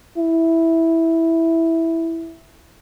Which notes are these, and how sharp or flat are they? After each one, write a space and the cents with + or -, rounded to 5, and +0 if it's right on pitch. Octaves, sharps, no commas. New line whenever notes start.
E4 -5